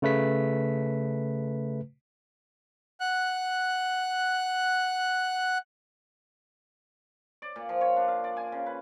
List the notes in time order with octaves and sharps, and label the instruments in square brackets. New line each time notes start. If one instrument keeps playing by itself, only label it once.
[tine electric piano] C#3 A3 B4 B6
[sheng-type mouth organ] F#5 F#6
[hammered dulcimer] D5
A#2
F3
C#5
D4
F5
D5
G#5
C#3
B4